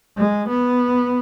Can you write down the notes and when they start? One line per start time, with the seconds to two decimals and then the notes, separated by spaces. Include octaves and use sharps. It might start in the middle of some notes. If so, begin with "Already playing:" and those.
0.18 G#3
0.49 B3